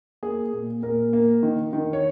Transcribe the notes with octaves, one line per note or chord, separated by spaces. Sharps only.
A#3 G#4
A#2
A#2 A#4
A#3
D#3
D#3
C#5